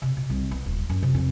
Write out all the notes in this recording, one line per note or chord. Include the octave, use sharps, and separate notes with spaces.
C3
B2
C2
B3
D#1
F#2
C3
F2